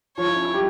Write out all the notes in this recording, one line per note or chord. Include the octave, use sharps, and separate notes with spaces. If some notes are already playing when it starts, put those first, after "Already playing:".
F3 F4 C#5
E4
C#4
E4
G3 G4